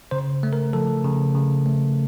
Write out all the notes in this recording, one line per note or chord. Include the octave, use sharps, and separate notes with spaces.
C#3 C5
A3
A#4
F3 A4
C#3
C#3
A3